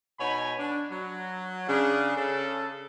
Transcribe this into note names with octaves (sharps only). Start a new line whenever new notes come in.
B2 D#4 C#5 G#5 B5
D4
F#3
C#3 D4 G#4
C#3 A4